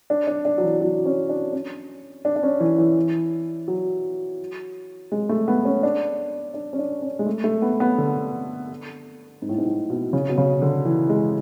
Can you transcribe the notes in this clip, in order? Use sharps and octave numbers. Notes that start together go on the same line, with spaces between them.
D4
D4
D4
F#3
E3
F#3
C#4
D4
C#4
D4
D4
C#4
E3
E3
F#3
G#3
A3
B3
C#4
D4
D4
C#4
D4
C#4
G#3
A3
A3
B3
B3
D3
G#2
A2
G#2
A2
B2
C#3
B2
C#3
D3
E3
G#3